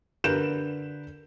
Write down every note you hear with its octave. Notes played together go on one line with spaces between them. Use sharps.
D3 A#4 B4 G6 E7